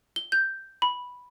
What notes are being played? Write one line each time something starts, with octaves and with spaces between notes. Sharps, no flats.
G7
G6
B5